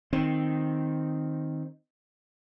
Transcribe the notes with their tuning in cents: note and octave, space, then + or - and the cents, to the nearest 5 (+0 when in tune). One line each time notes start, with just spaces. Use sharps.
D#3 +0 C4 +0